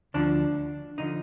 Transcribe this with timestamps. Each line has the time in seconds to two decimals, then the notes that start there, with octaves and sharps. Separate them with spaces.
0.14 D2 D3 F3 D4
0.98 D3 F3 D#4